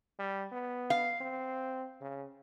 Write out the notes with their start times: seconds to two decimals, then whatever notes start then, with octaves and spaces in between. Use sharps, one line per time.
0.19 G3
0.52 B3
0.90 F5
1.21 C4
2.01 C#3